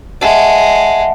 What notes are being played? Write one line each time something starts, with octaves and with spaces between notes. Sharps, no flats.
G#3 E5 F#5 A5